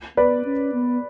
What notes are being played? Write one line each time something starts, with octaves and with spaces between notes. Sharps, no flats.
B3 B4 D5
C#4
B3